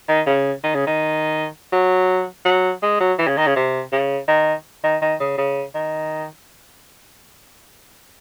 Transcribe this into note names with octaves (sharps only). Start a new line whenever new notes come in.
D#3
C#3
D#3
C#3
D#3
F#3
F#3
G#3
F#3
E3
C#3
D#3
C#3
C3
C#3
D#3
D#3
D#3
C#3
C#3
D#3